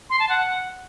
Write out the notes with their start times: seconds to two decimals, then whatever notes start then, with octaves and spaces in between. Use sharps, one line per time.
0.10 C6
0.20 A5
0.29 F#5